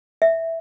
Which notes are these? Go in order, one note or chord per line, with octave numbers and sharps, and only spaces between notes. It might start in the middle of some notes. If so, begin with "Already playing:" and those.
E5